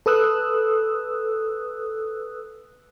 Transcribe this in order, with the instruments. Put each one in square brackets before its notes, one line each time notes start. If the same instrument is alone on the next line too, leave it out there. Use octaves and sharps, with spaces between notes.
[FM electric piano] A4 B4 D#6 E6 F#6